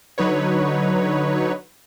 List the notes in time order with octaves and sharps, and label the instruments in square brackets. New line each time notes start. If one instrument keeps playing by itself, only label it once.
[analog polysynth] D3 F#3 D#4 B4 C#5